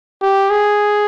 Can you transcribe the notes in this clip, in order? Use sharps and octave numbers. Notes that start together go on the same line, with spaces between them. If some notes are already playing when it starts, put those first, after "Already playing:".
G4
G#4